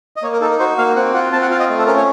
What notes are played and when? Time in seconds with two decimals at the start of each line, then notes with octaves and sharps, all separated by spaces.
0.16 D#5
0.22 A#3 C#5
0.33 A#4
0.41 D#4 A4
0.50 A#4
0.59 F#4 C5
0.78 A#3 F5
0.96 C4 F#5
1.14 F4 F#5
1.33 C4 A5
1.42 F#5
1.50 F4 F5
1.60 D#5
1.70 A3
1.79 A4
1.87 C#4 A#4
1.97 C#5